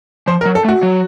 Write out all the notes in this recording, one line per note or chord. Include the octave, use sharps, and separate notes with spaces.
F3 C5
A#4
F#3
A4
A3
F#4
F#3